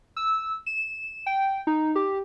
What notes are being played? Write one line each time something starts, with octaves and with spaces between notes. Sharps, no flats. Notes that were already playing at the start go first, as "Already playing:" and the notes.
E6
E7
G5
D#4
G4